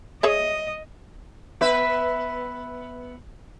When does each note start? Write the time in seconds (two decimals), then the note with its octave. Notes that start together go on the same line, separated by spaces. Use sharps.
0.23 G#4 C#5 D#5 E5
1.61 B3 B4 E5